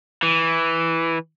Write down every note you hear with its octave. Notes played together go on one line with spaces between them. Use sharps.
E3